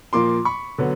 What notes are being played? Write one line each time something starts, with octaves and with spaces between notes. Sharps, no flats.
A#2 F3 A#3 C6 D6
B5 C#6
D3 F#3 B3